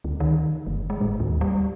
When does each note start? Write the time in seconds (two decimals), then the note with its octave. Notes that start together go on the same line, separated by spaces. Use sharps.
0.04 D2
0.20 D#3
0.67 G1
0.90 G#3
1.01 A2
1.20 D#2
1.41 G3